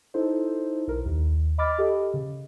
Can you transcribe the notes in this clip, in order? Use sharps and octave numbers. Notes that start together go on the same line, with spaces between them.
D#4 E4 A4 C5
B1 A#4
D#2
D#5 B5 D6 F6 A6
G4 A4 D#5
C#3